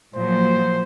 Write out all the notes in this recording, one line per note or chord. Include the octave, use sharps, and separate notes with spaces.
A#2 F3 F#3 C5